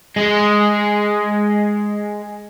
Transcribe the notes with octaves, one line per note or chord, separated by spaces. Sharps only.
G#3 G#4